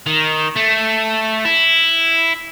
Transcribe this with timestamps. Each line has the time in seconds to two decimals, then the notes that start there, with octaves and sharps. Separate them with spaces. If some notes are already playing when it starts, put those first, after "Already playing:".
0.06 D#3
0.56 A3
1.45 E4